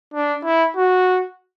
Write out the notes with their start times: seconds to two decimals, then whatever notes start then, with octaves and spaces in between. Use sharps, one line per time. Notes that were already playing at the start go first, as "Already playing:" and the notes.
0.14 D4
0.44 E4
0.76 F#4